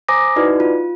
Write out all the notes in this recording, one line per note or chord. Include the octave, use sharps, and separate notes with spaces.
C5 G#5 A#5 D6 D#6 A#6
D#4 E4 F#4 B4 D5
F4